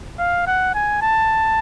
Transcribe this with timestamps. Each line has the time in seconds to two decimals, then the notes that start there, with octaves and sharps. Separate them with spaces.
0.18 F5
0.47 F#5
0.74 G#5
1.03 A5